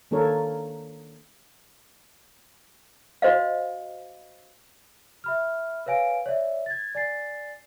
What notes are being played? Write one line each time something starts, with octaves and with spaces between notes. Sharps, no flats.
D#3 A#3 D4 A4 A#4 C#5
F#4 C5 D#5 F5
E5 B5 F6
B4 C#5 F5 G#5 D7
C#5 D5 E5
G#6 A6
D5 G#5 A6 C7